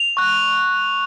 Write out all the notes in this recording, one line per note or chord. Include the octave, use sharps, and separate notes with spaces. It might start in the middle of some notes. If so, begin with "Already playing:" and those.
Already playing: F7
C#6 F#6